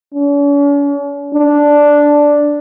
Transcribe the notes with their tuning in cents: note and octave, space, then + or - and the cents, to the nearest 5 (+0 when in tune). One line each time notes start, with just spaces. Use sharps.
C#4 +45
D4 +0